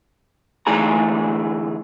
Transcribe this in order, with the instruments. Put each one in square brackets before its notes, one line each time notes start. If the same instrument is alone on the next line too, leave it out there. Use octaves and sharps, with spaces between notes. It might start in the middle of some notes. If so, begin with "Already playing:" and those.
[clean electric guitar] D2 E3 G#3 A3 G#4 A#5